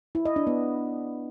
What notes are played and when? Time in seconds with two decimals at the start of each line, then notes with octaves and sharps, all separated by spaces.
0.15 E4
0.25 D#5
0.36 D4
0.47 B3